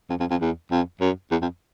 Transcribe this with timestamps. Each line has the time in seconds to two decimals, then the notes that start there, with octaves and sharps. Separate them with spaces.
0.10 F2
0.20 F2
0.31 F2
0.41 E2
0.71 F2
1.01 F#2
1.31 E2
1.42 F2